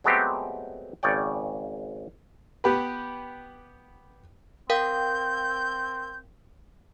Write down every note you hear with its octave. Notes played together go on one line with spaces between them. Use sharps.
F#3 G#3 A3 B3 C4 G4
G#1 C#3 C#5 D5 G5
B3 G4 B4
C4 A#4 F5 G5 G6